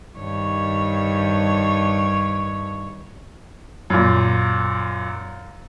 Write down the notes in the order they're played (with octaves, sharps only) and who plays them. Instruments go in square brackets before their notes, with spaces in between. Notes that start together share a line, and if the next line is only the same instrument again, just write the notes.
[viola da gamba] G2 D#3 C#5
[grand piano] F#2 A#2